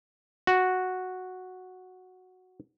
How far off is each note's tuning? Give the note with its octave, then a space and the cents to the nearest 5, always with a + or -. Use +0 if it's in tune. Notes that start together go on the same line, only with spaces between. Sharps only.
F#4 -5